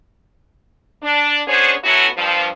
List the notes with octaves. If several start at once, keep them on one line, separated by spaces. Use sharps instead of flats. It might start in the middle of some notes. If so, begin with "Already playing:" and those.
D4
B3 C#4 D4 G#4 C5 C#5
F#3 A3 B3 C#4 E4 F#4
G2 F3